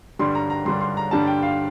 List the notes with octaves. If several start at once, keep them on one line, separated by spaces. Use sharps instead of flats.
G2 D3 G3 D4 C6
A#5
A#5
G2 D3 G3 D4 C6
C6
A#5
G2 D3 G3 D4 A5
G5
F5